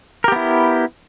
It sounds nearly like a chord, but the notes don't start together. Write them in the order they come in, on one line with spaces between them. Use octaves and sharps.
A#4 G4 B3 E4